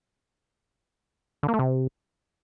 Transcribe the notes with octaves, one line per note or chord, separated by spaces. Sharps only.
D3
A#3
A3
C3